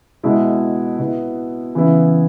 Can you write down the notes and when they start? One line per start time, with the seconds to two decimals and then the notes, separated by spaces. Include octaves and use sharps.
0.23 B2 G#3 E4
0.99 B2 B3 E4
1.75 C#3 E3 B3 E4